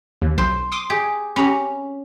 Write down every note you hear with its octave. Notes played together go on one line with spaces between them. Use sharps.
D#2
B1 C5
C6 D6 D#6
G4 G#4
C#4 G4 A#5 B5